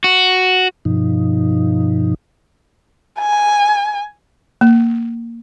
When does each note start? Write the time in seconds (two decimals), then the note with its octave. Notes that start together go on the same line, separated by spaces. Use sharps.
0.04 F#4
0.85 G2 B2 F3 D#4
3.19 G#5
4.61 A#3